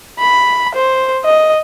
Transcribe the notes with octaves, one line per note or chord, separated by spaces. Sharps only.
B5
C5
D#5